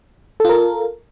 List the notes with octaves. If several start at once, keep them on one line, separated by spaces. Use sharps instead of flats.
F4 A4 A#4